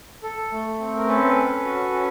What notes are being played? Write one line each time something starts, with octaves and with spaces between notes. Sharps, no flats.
A4
A3
C4
A#4
C#4 A4 B4
C#4
F#4
C#4